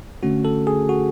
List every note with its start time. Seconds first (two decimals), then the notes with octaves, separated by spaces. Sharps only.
0.23 D3 A3 C#4 F#4
0.45 A4
0.67 G#4
0.89 F#4